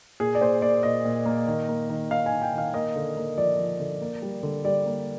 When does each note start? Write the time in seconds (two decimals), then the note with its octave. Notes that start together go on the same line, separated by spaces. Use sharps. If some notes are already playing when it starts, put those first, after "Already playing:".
0.20 A#2 G#4
0.35 D5
0.41 A#2 C5
0.62 A#2 D5
0.83 A#2 D#5
1.05 A#2
1.26 A#3
1.47 D#3
1.68 A#3
1.90 D#3
2.11 D#3 F5
2.26 G#5
2.32 D#3
2.42 G5
2.53 D#3
2.58 F5
2.74 A#3 D#5
2.96 D3
3.17 A#3
3.38 F3 D5
3.59 F3
3.80 D3
4.01 A#3
4.22 G3
4.43 D3
4.65 G3 D5
4.86 A#3